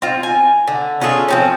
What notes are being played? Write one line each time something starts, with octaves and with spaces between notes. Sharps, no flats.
C4 F4
G#5
D3
C#4 F4 G#4 A4
F3 C4 C#4